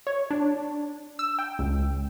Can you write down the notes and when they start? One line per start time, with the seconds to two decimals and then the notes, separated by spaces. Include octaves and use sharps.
0.07 C#5
0.30 D4
1.19 E6
1.39 G5
1.59 C#2